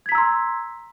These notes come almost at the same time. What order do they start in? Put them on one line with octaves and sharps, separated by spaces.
G#6 B6 A#5 E6 C6